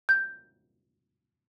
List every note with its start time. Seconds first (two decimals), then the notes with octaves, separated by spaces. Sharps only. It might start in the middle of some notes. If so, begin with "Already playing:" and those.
0.09 G6